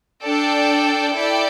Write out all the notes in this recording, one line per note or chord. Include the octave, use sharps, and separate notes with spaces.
D4 A4 D5 G5
E4 A4 D5 G5